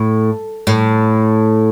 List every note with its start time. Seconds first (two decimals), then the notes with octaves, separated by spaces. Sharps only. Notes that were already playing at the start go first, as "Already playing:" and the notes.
Already playing: A2
0.67 A2